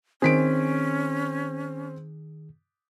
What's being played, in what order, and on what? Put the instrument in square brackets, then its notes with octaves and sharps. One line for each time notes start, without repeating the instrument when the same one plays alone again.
[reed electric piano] D#3 G#4 [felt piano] C4 B6 D7 [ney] C#4